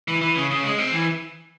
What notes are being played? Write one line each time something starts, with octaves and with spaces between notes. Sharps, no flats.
E3
E3
C#3
C#3
G#3
C4
E3